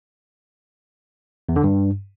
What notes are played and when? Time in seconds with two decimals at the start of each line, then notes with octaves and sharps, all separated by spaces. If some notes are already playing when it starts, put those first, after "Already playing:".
1.49 E2
1.56 D3
1.64 G2